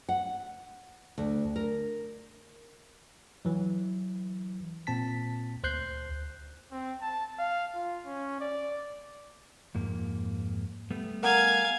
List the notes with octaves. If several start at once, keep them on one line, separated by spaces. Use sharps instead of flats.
F#5
D2
A#4
E3 F#3
A#2 C4 A5 B6
D2 C5 F#6 G6 C7
C4
A5
F5
F4
C#4
D5
F2 G#2 A#3
G3 A3 B3
A#4 F5 F#5 G#5 A#5